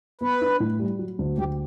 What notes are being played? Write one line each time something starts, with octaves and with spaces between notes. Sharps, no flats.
B3 B4
D4
A2
G3
F#3
D2
D2 G4